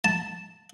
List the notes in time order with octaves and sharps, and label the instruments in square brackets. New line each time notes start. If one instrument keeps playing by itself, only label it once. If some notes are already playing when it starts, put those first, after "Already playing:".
[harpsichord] A5